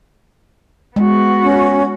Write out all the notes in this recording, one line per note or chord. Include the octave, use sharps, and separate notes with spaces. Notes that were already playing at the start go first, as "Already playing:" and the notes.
G#3 B3 F#4
C#4